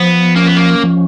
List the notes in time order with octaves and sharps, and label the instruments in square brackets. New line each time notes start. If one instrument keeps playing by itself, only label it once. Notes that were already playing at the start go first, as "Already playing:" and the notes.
Already playing: [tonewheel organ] F3 [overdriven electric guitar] B3
[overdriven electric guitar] A#3 [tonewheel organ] C#4
[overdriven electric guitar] B3
A#3
[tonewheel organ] F3